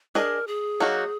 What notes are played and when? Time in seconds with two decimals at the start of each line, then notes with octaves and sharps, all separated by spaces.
0.15 D4 G#4 A#4 D#5
0.47 G#4
0.80 F#3 A#3 D#4 F#4